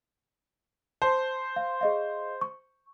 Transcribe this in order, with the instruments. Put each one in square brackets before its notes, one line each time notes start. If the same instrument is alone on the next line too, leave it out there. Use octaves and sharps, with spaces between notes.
[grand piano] C5 [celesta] A5
[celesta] F5
G#4 D#5 F5
C#6